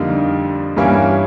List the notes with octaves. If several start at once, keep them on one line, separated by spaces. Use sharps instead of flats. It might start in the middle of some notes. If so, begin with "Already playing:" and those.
Already playing: F2 D3 G3 A#3 D#4
G2 E3 G3 A#3 C#4